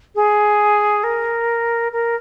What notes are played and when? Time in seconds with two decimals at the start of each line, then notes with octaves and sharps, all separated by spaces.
0.15 G#4
1.04 A#4
1.92 A#4